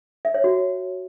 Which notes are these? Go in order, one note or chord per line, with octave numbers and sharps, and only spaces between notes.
E5
C#5
F#4